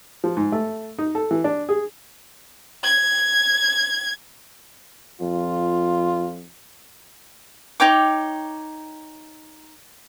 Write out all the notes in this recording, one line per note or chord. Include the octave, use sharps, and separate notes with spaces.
F3
G#2
A3
D#4
A4
E3
D4
G#4
G#6
F2 F4
D#4 C#5 G5 D6